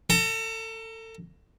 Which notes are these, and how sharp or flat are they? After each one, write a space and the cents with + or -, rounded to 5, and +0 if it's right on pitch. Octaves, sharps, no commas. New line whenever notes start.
A4 +30 A#5 +0